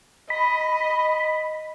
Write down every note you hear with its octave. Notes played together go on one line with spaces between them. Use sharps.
D#5 B5